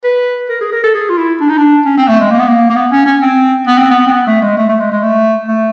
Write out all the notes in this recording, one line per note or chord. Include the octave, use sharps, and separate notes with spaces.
B4
A#4
G#4
A#4
A4
G#4
F4
E4
D4
D#4
D4
C#4
C4
A3
G#3
A#3
B3
A#3
A#3
B3
C#4
C#4
C4
B3
C4
B3
C4
B3
A3
G#3
A3
A3
G#3
G#3
A3
A3